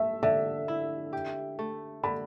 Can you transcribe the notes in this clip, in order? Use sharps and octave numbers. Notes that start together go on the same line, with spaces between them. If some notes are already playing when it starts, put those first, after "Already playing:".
Already playing: A3 E5
D3 E5
E4
G4
A3
D3 B5